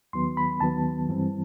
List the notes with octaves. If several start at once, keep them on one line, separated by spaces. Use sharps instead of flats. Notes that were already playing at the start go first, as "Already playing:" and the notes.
D#2 D#3 F#3 B3 C6
B5
D#2 D#3 F#3 B3 A5
G2 E3 G3 C4